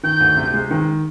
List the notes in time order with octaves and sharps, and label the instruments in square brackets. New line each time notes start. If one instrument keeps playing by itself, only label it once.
[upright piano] D#3 [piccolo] G6
[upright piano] D2
C3
G#3
D#3